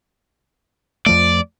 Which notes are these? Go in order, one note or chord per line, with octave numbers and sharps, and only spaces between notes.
F2 F3 A3 D5